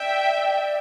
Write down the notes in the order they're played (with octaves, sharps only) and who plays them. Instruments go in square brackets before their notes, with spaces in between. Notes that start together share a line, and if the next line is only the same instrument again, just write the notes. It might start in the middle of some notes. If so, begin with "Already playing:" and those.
Already playing: [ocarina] D5 [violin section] E5 G5